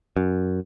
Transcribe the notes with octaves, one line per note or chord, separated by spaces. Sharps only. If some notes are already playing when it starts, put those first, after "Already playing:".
F#2